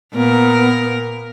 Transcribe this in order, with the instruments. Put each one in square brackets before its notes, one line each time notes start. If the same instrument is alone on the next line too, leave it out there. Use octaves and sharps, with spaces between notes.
[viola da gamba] A#2 A#4 [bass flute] B3